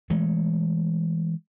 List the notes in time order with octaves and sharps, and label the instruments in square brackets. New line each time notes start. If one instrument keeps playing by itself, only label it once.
[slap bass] E3 G#3 A3